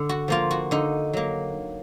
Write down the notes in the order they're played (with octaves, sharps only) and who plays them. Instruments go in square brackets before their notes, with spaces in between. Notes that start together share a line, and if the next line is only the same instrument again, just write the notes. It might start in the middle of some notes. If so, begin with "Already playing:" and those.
Already playing: [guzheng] D3
F#4
F3 A#3 F4
F#4
D3 D#4
F#3 A#3